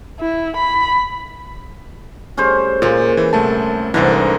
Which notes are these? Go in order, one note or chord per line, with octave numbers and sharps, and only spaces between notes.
E4
B5
G3 A3 C#4 G#4 C5
A#2 G#3 A#3
E3
C2 A3 A5
C2 G#2 D3 E3 D4 A#4 C5